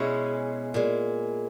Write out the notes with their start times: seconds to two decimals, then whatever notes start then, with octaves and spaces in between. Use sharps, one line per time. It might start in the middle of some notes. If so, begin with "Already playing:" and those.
Already playing: B2 G#3 C#4 E4
0.74 A#2 G#3